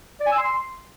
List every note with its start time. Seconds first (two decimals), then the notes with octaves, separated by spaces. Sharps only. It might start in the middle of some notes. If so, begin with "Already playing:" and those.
0.20 D5
0.26 G#5
0.32 E6
0.38 C6